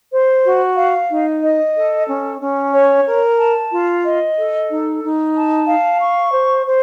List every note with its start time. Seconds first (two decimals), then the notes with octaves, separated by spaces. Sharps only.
0.12 C5
0.44 F#4
0.77 F5
1.10 D#4
1.43 D#5
1.75 A4
2.08 C#4
2.41 C#4
2.73 C#5
3.06 A#4
3.39 A5
3.71 F4
4.05 D#5
4.37 A4
4.70 D#4
5.03 D#4
5.35 A5
5.68 F5
6.01 C#6
6.33 C5
6.66 C5